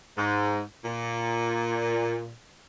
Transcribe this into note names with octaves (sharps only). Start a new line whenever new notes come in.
G#2
A#2